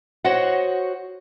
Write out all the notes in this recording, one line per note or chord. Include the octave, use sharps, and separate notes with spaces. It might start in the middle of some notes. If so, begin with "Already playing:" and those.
F#4 C5 C#5 D#5 F#5